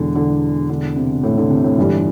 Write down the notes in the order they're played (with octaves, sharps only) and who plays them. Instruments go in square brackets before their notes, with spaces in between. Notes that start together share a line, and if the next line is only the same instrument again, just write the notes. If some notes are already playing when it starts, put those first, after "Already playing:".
Already playing: [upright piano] E1 E2 E3 [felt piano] D3
[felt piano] D3
D3
C3
A2
D3
C3
A2
[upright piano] G1 G2 E3 G3 [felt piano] D3